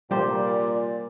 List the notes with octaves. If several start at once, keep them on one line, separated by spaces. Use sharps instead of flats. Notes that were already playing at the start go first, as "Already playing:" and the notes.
A#2 G3 A#3 G4 C5 D5